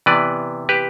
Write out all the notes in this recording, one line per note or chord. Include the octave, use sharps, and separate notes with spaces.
C3 E3 B3 B4 D5
G4 B4